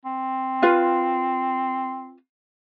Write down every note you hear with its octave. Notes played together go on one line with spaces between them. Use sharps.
C4
F4 B4 F5